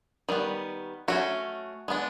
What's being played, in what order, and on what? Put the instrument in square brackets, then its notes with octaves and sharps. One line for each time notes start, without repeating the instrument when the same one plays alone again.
[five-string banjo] D#3 G3 B3
F#3 A3 C#4 F#4
G#3 B3 D4